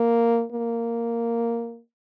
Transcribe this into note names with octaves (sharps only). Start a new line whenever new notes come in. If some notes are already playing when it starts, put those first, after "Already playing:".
Already playing: A#3
A#3